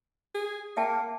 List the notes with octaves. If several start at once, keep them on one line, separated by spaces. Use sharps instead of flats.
G#4
A#3 E5 G5 A5